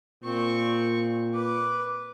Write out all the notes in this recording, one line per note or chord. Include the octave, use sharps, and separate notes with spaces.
A#2 C4 C#6
B4 D6